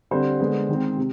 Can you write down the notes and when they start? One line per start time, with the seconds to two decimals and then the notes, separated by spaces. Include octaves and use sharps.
0.11 D3 G3 C4 C5
0.40 D3 G#3 B3
0.69 D#3 G#3 C4
0.97 C3